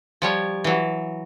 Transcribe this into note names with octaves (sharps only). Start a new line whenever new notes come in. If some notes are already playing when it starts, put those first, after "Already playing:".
F3 G3 C#5
E3 F#3